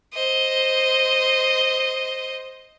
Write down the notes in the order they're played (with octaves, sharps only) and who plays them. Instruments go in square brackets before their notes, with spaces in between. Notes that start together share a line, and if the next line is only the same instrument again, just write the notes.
[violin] C5 D#5